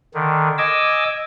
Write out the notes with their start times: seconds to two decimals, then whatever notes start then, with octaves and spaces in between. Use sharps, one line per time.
0.14 D3 D#3
0.58 D#5 G#5 D6 E6